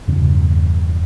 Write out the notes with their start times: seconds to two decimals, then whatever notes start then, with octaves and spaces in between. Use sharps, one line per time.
0.08 E2 G2 C#3